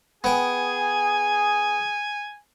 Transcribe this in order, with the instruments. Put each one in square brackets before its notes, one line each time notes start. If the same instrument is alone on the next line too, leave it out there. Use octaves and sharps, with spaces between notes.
[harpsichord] B3 G5 [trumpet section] G#4 [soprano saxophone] G#5